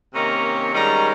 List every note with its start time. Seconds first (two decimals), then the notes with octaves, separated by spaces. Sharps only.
0.13 C3 D#3 A#3 C#4 A#5
0.73 G#2 D#3 G3 C#4 A#5